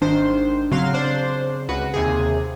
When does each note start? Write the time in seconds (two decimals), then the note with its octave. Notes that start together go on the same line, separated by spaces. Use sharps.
0.02 G#1 D#3 D4 C5
0.72 C#3 F#3 C4 F5 C6
0.94 D4 C5
1.69 C#2 F#4 B4
1.94 D#2 C3 G#4